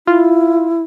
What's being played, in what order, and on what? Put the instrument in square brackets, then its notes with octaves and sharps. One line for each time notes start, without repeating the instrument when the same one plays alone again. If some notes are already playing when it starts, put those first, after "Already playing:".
[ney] E4 [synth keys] F4